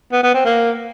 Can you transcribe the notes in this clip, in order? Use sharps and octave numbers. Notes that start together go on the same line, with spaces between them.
B3
B3
C4
A#3